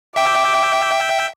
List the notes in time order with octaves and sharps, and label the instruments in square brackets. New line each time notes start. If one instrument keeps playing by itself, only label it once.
[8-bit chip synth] E5 G5 [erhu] D6